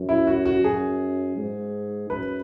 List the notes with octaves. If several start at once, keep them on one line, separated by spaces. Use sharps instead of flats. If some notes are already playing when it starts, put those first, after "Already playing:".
Already playing: F#2
E4
F#4
F#4
F#2 G#4
G#2
F#2 B4